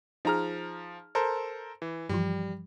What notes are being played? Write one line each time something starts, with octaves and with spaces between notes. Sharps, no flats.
F3 D#4 G#4 A#5 F6
A4 A#4 C5
E3
G2 E3 F3 G3